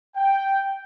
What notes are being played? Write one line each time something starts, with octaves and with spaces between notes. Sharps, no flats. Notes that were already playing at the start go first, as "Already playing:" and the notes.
G5